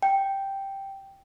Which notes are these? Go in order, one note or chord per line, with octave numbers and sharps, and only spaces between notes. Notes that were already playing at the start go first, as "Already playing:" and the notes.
G5